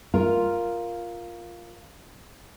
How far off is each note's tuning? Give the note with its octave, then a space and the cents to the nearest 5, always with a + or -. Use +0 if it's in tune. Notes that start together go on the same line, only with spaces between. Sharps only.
F4 +0 A#4 +0